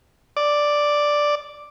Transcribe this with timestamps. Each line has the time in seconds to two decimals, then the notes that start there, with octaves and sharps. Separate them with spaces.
0.37 D5